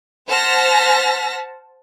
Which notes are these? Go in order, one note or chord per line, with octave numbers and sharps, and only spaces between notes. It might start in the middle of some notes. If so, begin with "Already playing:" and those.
C5 F#5 A5 F6 A#6 B6